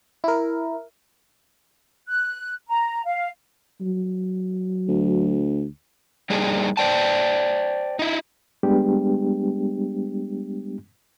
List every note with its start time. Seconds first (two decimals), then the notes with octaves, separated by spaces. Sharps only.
0.24 E4 A#4
2.08 F#6
2.68 A#5
3.06 F5
3.81 F#3
4.88 D2
6.30 G3 A#3 D4 D#4 G#4
6.77 C5 D5 G5 A5
7.99 D#4 E4
8.63 G3 G#3 B3 D4 G4